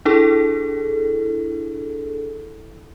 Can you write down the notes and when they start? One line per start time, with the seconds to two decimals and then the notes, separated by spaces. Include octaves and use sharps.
0.05 D4 E4 G#4 A4